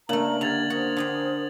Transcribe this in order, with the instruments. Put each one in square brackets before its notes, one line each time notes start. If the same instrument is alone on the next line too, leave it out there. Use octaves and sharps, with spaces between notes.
[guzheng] C#3 A3 [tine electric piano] A#3 D4 [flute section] A#4 D5 A#5 [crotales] F#7
[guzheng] D3 [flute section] G4 F6 [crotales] G#6 A6 F7
[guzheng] F#4 [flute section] A#4 C5 D#6
[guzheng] D3 G#4 G5